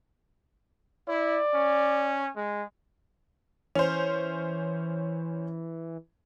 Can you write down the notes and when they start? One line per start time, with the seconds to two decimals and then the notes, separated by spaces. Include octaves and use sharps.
1.08 E4 D5
1.55 C#4
2.36 G#3
3.75 E3 C#4 C5